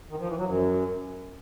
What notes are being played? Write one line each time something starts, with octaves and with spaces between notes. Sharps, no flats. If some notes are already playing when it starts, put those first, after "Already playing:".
D#3
F3
E3
F#3
F#2